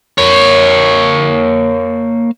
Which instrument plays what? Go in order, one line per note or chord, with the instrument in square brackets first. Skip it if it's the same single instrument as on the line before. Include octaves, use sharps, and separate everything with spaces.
[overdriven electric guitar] A#3 C#5